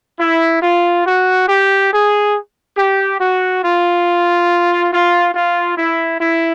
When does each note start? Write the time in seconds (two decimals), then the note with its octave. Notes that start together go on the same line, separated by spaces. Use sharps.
0.19 E4
0.62 F4
1.06 F#4
1.48 G4
1.92 G#4
2.77 G4
3.20 F#4
3.64 F4
4.92 F4
5.34 F4
5.78 E4
6.21 E4